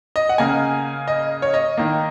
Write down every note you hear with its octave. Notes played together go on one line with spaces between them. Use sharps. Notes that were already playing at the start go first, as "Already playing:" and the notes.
D#5
F#5
C#3 A#3 G#5
D#5
C#5
D#5
D#3 A#3